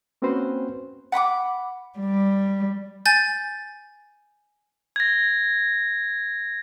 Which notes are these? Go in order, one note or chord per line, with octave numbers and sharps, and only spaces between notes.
A#3 C4 C#4 F#4 B4 C5
F#5 B5 C#6 D6
G3
G#5 G6 A6
G#6 A#6